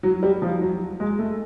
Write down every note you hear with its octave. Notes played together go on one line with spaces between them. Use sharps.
F#3
G3
F3
F#3
G#3
A3